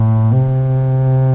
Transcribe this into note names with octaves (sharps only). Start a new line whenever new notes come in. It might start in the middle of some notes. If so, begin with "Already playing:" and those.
Already playing: A2
C3